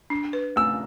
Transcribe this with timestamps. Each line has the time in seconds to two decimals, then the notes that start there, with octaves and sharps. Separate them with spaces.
0.10 D4
0.33 B4
0.56 A3 E6